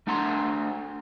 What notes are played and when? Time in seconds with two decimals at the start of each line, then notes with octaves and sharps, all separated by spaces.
0.07 A3 D4 F#5 A#5 C6